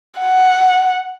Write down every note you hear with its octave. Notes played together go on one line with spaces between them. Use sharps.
F#5